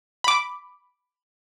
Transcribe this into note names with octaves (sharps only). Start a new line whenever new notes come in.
B5 D6